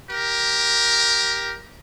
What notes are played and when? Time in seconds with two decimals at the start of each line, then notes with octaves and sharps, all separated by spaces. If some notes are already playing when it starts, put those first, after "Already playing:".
0.11 G4 A#4